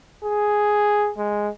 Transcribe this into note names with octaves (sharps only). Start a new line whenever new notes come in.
G#4
G#3